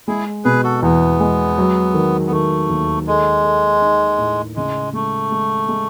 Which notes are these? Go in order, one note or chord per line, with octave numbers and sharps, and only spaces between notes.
G#3 E4 G#4
B2 G#4 B4
F#4 A4
E2 B3
G#3
F#3
D#3
B3
D#3 A3
D#2
G#3 A4
A4
D#4
A2
C#3 G#3
G#3 A3
G#3
G#3